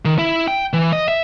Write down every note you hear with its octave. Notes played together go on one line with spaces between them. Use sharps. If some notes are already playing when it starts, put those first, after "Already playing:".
D#3
E4
G5
E3
D#5
E5